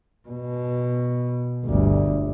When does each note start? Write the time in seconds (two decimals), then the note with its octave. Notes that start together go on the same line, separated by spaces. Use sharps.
0.29 B2
1.65 G1 D2